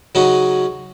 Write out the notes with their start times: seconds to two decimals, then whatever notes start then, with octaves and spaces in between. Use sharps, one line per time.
0.15 C#3 F#3 C#4 D#4 F#4